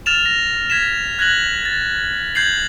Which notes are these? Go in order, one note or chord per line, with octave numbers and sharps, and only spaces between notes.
F6 A6 E7 F7
A#6
G#6 B6 E7
F#6 G#6 A#6 F#7
A6
G6 G#6 C7 F#7